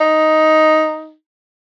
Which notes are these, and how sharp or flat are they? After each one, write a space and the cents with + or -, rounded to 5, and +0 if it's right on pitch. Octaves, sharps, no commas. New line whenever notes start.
D#4 +5